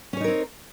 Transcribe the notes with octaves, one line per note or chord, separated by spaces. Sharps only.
C4 C#4 D#4 A#4 C#5